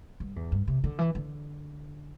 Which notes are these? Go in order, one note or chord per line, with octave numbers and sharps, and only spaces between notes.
G2
E2
G2
C3
D3
E3
D3